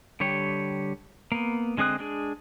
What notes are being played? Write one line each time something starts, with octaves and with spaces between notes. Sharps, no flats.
D3 G3 G4 C#5
A#3 B3
D3 G#3 C4 D#6 F#6
G#3 D4 G#4